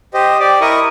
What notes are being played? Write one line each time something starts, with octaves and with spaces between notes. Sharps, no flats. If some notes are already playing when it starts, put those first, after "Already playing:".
G4 C5 D#5
G4 D5 D6
E4 A#4 D#5 C#6 D#6